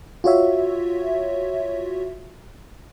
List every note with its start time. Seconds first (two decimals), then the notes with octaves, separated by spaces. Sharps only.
0.24 F4 F#4 C#5 E5